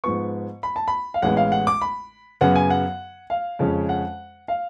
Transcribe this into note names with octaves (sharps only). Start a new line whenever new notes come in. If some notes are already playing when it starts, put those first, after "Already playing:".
G#2 F3 B3 C#6
B5
A5
B5
F5
A1 A2 G#3 B3 F#5
F5
F#5
D6
B5
F#2 C#3 F#3 B3 F#5
G#5
F#5
F5
F2 C#3 G#3 C#4
F#5
F5